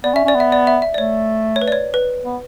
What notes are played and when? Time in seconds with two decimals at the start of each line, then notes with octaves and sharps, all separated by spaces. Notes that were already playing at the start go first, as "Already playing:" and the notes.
0.04 B3 D5
0.14 C#4 E5
0.25 C#4
0.28 D5
0.35 B3
0.40 E5
0.52 D5
0.67 E5
0.82 E5
0.94 D5
0.98 A3 C#5
1.56 C#5
1.62 B4
1.68 D5
1.72 C#5
1.94 B4
2.25 B3